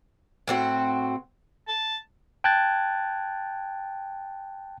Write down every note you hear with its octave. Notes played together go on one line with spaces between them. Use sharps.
A2 C4 F#4
A5
G5 A5 F#6 G#6 A6